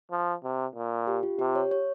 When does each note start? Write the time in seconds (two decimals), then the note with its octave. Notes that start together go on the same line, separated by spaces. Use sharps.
0.11 F3
0.43 C3
0.75 A#2
1.07 G4
1.23 F4
1.39 C3 G4
1.55 C#5
1.71 C#5